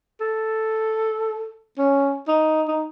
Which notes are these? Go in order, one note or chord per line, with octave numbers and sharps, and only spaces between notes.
A4
C#4
D#4
D#4